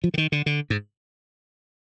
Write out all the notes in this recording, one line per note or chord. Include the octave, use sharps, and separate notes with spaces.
F3
D3
D#3
D3
D3
G#2